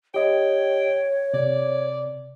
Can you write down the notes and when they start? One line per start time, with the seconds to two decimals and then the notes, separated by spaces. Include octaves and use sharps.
0.14 G4 C#5 D#5 G5
1.34 C3 D5